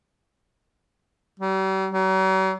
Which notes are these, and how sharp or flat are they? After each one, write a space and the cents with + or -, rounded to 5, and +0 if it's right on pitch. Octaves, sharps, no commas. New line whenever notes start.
G3 -45
F#3 +45